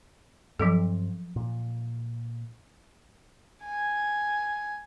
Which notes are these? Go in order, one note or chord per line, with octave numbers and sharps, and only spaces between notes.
G2 F3 F#3 C4 A4
A#2
G#5